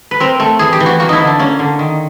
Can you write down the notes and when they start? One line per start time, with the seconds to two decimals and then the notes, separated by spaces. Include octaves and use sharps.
0.11 B4
0.20 C4 A#4
0.40 A3
0.59 E3 G#4
0.73 G4
0.80 E3
0.86 F#4
1.00 A#3 F#4
1.09 D#4 E4
1.19 D3
1.27 D4
1.39 A#3 C#4
1.59 D3
1.79 D#3